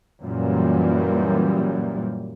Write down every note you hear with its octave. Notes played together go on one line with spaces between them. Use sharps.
F#2 A#2 E3 G3